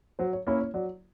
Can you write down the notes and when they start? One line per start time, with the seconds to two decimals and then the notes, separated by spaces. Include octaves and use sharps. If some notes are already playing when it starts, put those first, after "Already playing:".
0.19 F#3 C5
0.33 C#5
0.47 A#3 C#4 E4 C#5
0.61 C#5
0.74 F#3 D5